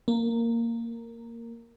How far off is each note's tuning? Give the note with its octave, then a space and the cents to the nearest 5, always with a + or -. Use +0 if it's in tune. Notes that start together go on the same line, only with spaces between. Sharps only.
A#3 -10